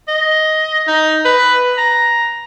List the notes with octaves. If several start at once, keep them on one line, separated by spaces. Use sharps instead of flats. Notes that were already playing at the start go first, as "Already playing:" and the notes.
D#5
D#4
B4
A#5